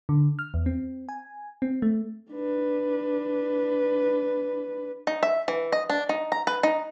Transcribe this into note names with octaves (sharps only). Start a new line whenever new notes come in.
D3
F6
E2
C4
G#5
C4
A3
D4 B4
D#4
E5
E3
D#5
D4
D#4
A#5
B4
D#4